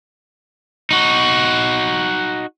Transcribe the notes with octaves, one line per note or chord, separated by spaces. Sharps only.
D#4 F#4